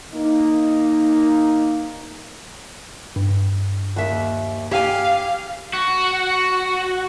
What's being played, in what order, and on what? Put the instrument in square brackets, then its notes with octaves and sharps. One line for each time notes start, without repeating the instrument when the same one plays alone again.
[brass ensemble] A#3 D#4
[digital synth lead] G2
[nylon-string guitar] D#2 E5
[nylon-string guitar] G4 G#5 [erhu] F5
[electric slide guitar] F#4